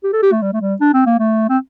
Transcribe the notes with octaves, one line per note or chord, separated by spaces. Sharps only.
G4
A4
G4
A3
G3
A3
G3
D4
C4
A#3
A3
C4